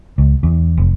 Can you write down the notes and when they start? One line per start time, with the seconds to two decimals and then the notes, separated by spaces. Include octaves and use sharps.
0.18 C#2
0.43 E2
0.78 F1